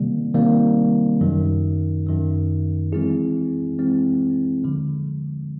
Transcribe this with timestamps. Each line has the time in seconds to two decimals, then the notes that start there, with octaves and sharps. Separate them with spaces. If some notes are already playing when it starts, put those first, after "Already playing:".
Already playing: C3 D#3 G3 A#3
0.34 C3 D#3 G3 A#3
1.21 F#2 D#3 F#3
2.06 F#2 D#3 F#3
2.92 E3 G#3 C4 E4 G#4
3.78 E3 G#3 C4 E4 G#4
4.64 D#2 D3 F3 G#3